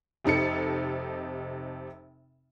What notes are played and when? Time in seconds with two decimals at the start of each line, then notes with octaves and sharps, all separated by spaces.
0.24 F1 C3 D#4 A4 C#7